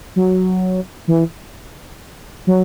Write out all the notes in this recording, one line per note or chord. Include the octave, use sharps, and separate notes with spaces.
F#3
E3
F#3